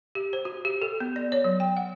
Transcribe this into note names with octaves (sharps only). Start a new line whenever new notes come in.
G4
C5
F#4
G4
A4
B3
D5
C#5
F#3
G5
F#5